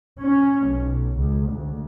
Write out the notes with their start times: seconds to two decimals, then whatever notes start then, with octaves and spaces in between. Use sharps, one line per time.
0.20 C#4
0.66 B1
1.17 C#2
1.51 D2